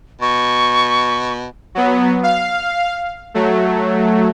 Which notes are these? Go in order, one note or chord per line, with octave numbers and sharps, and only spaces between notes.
B2 C#6
F#3 B3
F5
F#3 A3